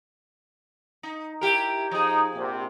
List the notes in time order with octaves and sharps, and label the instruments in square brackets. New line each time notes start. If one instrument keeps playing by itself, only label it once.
[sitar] D#4
E4 G4 A#4
[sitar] F3 G#4 [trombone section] D#4
[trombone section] A#1 C3